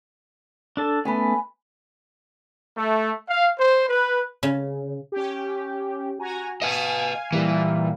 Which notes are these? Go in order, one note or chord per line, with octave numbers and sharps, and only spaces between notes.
D4 A4 A5
A3 B3 C#4 B4 G#5
A3
F5
C5
B4
C#3
C#4 G4
F#4 G#5 A#5
B4 D#5 F5 G#5
A#2 E3 G3 A#3